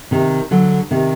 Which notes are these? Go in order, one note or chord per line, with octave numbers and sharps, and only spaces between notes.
C3 D#3
D3 F#3
C3 D#3